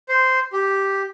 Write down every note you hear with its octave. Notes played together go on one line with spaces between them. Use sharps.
C5
G4